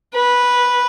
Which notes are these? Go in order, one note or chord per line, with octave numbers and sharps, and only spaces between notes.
B4